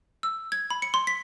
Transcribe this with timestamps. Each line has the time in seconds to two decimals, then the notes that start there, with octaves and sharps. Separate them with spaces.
0.23 E6
0.52 G#6
0.70 B5
0.82 C#7
0.94 C6
1.07 B6